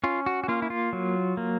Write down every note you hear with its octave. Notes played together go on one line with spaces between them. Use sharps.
C#4 F4
F#4
F#4
A#3 F4
E4
F4
F#3
A#3